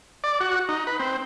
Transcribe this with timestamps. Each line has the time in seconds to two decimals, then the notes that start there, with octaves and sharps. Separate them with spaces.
0.24 D5
0.40 F#4
0.69 D#4
0.87 B4
0.99 C4